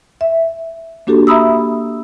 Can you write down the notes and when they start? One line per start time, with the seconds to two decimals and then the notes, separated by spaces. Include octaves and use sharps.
0.21 E5
1.07 A#3 D4 F#4 G4 A4
1.27 E5 A#5 B5 D#6 E6